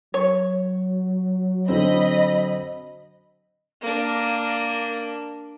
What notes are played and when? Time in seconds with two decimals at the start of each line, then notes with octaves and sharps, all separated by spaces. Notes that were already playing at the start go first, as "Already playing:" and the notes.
0.14 F#3 C#5
1.68 D3 C4 D#5 B5
3.81 A#3 D4